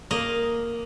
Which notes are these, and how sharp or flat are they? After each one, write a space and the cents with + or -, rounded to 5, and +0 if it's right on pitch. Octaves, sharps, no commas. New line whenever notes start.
A#3 +0 D#5 +0